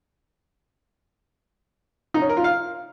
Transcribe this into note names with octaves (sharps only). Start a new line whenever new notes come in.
D#4
C#4
A#4
F4
F5